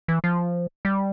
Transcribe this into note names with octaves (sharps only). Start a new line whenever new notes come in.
E3
F3
G3